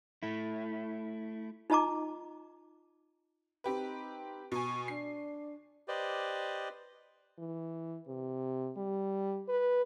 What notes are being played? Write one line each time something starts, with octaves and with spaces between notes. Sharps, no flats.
A3 E4
D#4 F4 D#5 A5 A#5 D6
C4 D#4 G4 B4
B2 G#5 C#6
D4 C7
G4 B4 C5 D5 D#5
E3
C3
G3
B4